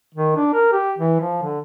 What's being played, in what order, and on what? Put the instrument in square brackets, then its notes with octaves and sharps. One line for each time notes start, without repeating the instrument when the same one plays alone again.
[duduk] D#3
D4
A#4
G4
E3
F3
D3